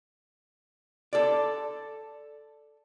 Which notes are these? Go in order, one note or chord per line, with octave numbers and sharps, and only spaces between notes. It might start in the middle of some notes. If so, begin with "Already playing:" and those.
A4 D5